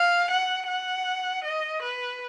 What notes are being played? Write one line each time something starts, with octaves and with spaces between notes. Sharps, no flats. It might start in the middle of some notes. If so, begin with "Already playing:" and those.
Already playing: F5
F#5
F#5
D#5
B4